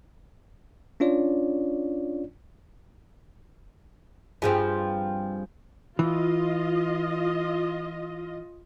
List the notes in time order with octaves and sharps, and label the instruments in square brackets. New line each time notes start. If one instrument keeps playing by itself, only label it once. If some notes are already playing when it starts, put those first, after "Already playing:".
[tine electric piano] C#4 D4 F4 C#5 D5
[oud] G2 F3 C4 [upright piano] G#4
[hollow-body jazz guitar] E3 [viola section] F4 D#5